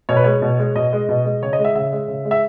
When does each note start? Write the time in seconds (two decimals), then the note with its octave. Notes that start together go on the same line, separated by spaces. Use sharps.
0.09 B2 C#5
0.16 B4
0.24 G#3 C#5
0.42 B2
0.59 G#3
0.76 B2 D#5
0.93 G#3
1.09 B2
1.25 G#3
1.42 C#3 C#5
1.53 D#5
1.59 G#3
1.64 E5
1.75 C#3 E5
1.93 G#3
2.08 C#3
2.25 G#3
2.31 E5